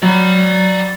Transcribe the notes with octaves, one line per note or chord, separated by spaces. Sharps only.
F#3 D5 B5